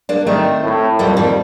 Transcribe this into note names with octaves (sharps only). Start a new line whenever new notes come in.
A#3 D4
D#3 A3 C4
A2
F2 G3 A#3
D#3 G3